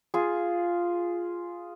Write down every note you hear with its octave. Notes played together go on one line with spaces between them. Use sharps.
F4 G#4